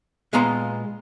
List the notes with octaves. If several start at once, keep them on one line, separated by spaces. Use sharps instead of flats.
A#2 G#3 B3 F5 A#5 C6